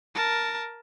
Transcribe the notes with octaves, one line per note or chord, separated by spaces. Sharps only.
A#4 A5